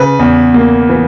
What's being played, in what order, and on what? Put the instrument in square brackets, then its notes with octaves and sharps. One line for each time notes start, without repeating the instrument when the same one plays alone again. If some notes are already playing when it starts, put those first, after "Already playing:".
Already playing: [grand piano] C#3 B4
E2
A#3
E3